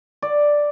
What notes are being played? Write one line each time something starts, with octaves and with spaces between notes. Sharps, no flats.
D5